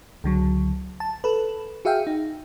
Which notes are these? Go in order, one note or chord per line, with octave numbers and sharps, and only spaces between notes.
C#2 D3 F#3
A5
A4 B4
F#4 G#4 E5 F5 G5
D#4